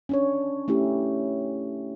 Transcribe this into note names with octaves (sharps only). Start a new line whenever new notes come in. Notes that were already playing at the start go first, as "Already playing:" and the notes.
C#4 D4 C#5
A3 C#4 E4 G4